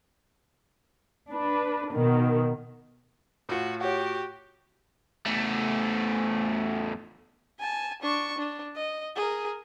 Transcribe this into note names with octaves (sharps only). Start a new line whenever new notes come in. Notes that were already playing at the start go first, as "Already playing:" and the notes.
D4 B4
B2 D#3
A2 F4 F#4
F#4 G4 C#5 F#5
E2 A3
G#5 A5
D4 C#6
D4
D#5
G#4 A#4